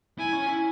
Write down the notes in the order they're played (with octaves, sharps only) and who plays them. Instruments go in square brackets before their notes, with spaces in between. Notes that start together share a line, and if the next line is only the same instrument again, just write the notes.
[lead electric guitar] E4 [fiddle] G#5
[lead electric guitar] C#4
E4